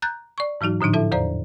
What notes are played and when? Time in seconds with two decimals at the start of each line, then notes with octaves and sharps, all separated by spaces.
0.02 A#5 F#6 G6 A6
0.38 D5 C#6
0.61 G#2 E3 F#3 D#4 F#4
0.81 A2 D3 F3 D4 D#4
0.93 E4 A4 E5 A5
1.12 E2 C5 D5 A#5